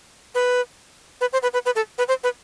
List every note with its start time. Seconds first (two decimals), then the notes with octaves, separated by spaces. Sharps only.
0.35 B4
1.21 B4
1.33 C5
1.43 B4
1.53 B4
1.65 B4
1.75 A4
1.98 B4
2.08 C5
2.23 B4